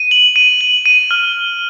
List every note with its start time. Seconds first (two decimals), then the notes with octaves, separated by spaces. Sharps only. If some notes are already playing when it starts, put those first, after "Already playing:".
Already playing: D#7
0.11 F#7
0.36 D#7
0.61 F#7
0.86 D#7
1.11 F6